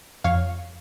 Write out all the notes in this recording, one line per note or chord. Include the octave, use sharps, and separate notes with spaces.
F2 C#5 F5